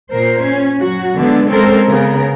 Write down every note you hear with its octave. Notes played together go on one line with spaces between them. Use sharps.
A#2 A#4 C5
C#4
F#3 F#4
D3 G#3 B3 D4
G#3 C4 C#4 A4 A#4 C5
C#3 B3 A#4